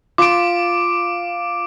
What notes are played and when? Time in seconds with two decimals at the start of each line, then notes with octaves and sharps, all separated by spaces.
0.18 F4 D6 D7